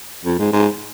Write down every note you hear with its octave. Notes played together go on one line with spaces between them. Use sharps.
F2
G#2
G#2